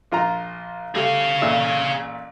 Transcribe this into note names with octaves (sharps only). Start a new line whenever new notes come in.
A#1 F4 A#5
G3 A3 G#4 F5
A1 A#2 E5